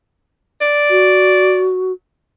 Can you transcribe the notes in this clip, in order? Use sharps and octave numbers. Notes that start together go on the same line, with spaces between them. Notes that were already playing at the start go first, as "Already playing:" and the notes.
D5
F#4